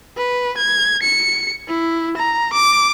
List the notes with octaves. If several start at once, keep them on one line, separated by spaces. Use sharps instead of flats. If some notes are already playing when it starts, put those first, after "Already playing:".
B4
G#6
C#7
E4
A#5
D6